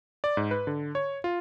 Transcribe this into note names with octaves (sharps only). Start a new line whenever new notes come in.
D5
G#2
B4
D3
C#5
F4